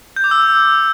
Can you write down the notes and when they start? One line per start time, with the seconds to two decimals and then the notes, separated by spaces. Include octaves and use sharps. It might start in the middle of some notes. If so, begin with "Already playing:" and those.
0.16 G6
0.24 D6
0.31 E6